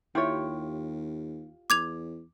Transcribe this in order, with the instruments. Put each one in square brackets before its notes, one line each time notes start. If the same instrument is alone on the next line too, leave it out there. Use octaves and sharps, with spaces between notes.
[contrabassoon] D#2 [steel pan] E4 G5 [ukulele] F4 G4 C#5
[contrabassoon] E2 [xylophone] D6 G#6 F7